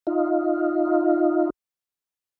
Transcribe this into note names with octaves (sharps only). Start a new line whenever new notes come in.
D#4 F4